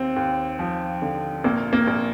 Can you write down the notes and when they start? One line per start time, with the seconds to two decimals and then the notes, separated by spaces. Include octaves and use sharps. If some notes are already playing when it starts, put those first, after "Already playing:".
Already playing: D#2 C4
0.16 D#2
0.59 F3
1.02 D3
1.44 A#1 A#3
1.73 A#3
1.88 A#1